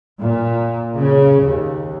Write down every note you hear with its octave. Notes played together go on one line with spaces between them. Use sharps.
A#2
C#3
D#2